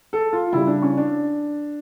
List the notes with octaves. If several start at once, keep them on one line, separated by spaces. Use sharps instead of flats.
A4
F4
C#3 G3 E4
D4
C#4
D4